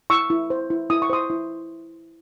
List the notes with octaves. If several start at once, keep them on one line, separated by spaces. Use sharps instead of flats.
E4 C#6 E6
E4
C5
E4
E4 D#6
C#6
C5 C6 D#6
E4